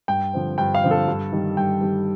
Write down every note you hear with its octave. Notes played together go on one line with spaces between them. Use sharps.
G2 G5
D3 F3 C4
G2 G5
F5
D3 F3 C4
A4
G2
D#3 G3
G2 G5
D#3 G3